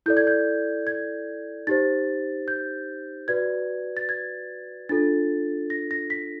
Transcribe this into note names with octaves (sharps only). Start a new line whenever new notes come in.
E4 A4 D5 G6
G#6
G6
G#6
D#4 G4 C5 A6
G6
F#4 B4 D5 G#6
A6
G#6
D4 F4 A4 A6
A#6
A#6
B6